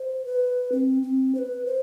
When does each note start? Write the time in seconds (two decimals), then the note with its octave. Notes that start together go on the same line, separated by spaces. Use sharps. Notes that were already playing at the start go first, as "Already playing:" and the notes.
Already playing: C5
0.25 B4
0.72 C4
1.03 C4
1.35 C5
1.39 B4
1.66 C5